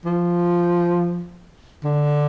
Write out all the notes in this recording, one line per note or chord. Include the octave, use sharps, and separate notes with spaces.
F3
D3